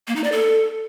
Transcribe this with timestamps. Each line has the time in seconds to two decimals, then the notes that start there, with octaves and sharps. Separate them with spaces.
0.08 A#3
0.16 D#4
0.24 D5
0.32 A4